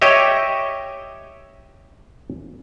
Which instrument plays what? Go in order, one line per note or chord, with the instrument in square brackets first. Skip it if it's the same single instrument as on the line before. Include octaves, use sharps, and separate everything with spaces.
[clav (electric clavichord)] G4 C#5 D#5 E5